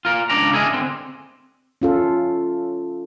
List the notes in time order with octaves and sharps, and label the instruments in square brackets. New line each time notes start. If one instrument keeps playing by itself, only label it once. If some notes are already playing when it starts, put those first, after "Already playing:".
[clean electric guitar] F4 A#4
C#2 D4 D5 A#5
E4 G#4 A#4 D#5
D3 C4
[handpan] C#4 F4 A4